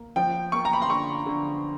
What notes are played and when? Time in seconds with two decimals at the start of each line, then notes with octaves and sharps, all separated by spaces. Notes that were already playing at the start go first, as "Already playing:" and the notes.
Already playing: A#3
0.16 F3 G5
0.52 A#3 C#6
0.65 A#5
0.73 B5
0.82 C6
0.90 D3 C#6
1.26 D3